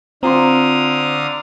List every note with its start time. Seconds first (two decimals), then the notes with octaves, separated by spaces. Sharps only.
0.23 D3 C4 F4 F5 A#5 C6 D#6